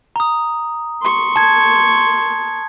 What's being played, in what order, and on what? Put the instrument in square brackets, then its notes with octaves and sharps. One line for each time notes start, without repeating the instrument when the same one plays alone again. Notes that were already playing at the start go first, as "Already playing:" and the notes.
[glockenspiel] A#5 D#6
[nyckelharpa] C6 C#6
[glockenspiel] A5 G#6